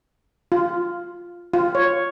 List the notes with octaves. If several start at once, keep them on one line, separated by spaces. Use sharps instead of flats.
F4
F4
C#5